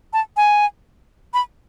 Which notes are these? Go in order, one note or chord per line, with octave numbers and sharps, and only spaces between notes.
A5
G#5
B5